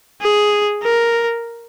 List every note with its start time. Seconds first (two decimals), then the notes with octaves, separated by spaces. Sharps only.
0.21 G#4
0.83 A#4